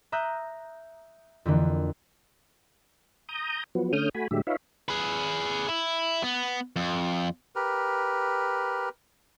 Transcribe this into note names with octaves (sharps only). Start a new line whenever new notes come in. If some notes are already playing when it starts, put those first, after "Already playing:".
E5 A#5 D#6 F#6 G6
F2 D3 E3 A#3
A#5 D#6 G6
F3 F#3 B3
D3 A3 C#4 D#6 F6 G6
A3 F#4 G#5 B5
A2 D3 F#3 G#3 G4 E5
D#4 F4 B4 C#5 E5 F5
G#4 B4
E4
B3
F2
G4 A#4 B4